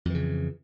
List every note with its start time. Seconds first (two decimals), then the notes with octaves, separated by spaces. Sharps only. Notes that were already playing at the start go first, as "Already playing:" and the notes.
0.05 F2
0.10 E3
0.14 C#3